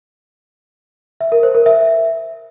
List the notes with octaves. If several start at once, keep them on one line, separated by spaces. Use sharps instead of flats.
E5
A#4
C5
A#4
E5